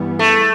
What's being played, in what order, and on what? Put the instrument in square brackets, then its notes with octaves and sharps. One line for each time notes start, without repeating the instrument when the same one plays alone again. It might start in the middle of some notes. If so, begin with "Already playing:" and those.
Already playing: [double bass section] G2 E3 G3 B3
[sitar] A3